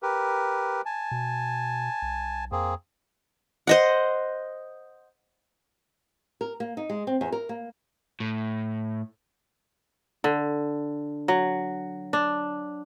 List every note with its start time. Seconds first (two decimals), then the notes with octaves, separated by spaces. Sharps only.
0.03 G4 A#4 B4
0.86 G#5 A5
1.12 B2
2.02 B1
2.52 F2 A#3 C4 G#4
3.67 C5 D#5 F#5
6.41 A#4
6.60 A#3
6.77 D#4
6.90 G#3
7.07 C4
7.21 E2
7.32 A#4
7.49 A#3
8.20 A2
10.24 D3
11.28 F#3
12.13 D4